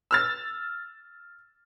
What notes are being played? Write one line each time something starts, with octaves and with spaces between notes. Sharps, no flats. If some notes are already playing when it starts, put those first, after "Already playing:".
E6 F6 A6